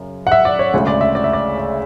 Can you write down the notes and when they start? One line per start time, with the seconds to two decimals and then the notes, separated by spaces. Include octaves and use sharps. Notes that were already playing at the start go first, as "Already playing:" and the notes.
Already playing: F#2 C#3
0.27 F#5
0.32 E5
0.45 D5
0.59 C#5
0.74 D2 C#3 G#3 C#5
0.87 D5
1.01 E5
1.15 D5
1.24 E5
1.33 D5
1.57 D5